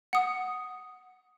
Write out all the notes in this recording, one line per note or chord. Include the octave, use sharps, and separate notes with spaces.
F#5 D#6